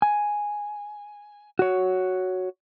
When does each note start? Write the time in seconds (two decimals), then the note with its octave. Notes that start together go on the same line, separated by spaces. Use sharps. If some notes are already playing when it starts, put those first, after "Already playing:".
0.02 G#5
1.59 F#4 C#5